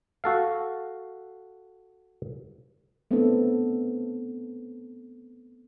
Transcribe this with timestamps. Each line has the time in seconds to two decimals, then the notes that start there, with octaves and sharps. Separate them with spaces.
0.24 F#4 A4 F5
3.11 A3 B3 C4 D4 E4 A4